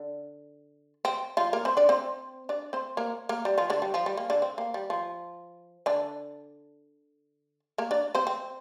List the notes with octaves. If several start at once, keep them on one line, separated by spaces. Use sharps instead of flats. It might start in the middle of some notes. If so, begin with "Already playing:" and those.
Already playing: D3
C4
F3 F4
A#3 A#4
C4 C5
D4 D5
C4 C5
D4 D5
C4 C5
A#3 A#4
A#3 A#4
G3 G4
F3 F4
D3 D4
G3
F3
G3
A#3
D3 D4
C4
A#3
G3
F3
D3 D4
A#3 A#4
D4 D5
C4 C5
C4